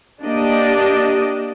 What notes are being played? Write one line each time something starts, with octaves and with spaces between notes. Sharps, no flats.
A#3 D4 G4 D5 D#5